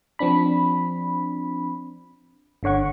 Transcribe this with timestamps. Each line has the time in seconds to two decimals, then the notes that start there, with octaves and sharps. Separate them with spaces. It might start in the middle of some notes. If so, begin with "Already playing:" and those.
0.19 F3 C4 D4 B5
2.63 G1 D3 C#5 F#5 C#6